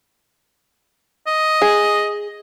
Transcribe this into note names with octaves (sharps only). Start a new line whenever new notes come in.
D#5
G#4